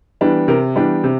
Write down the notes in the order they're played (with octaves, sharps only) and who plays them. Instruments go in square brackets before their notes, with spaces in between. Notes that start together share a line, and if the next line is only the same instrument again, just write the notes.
[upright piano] E3 G3 B3 D4
C3 A#4
E3 G3 B3 D4
C3